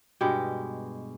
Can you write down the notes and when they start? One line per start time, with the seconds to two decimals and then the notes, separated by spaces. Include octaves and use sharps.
0.21 G2 B2 G#3 G4